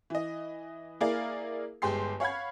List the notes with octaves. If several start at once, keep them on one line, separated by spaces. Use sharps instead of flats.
E3 D#5
A#3 E4 G#4 A#4 D5 F5
G1 G#3 G4 C6 C7
C#5 F5 F#5 B5 G#6